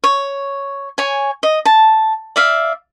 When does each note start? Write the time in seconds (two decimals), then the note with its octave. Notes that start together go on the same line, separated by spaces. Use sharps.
0.04 C#5
0.98 C#5 G#5
1.43 D#5
1.65 A5
2.36 D5 E5 F5